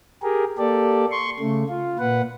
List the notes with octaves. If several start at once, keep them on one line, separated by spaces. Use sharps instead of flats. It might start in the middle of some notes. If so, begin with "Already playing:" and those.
G4 G#4 A#4
A#3 G4 A4 D5
C6 C#6
C#3 A3
F4
A#2 B4 F#5